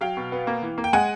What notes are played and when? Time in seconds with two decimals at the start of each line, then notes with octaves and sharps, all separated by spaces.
0.01 F#3 F5 G5
0.17 B2
0.32 B3
0.47 A#3
0.62 E3
0.78 A#3
0.84 G5
0.93 G#3 F#5 G#5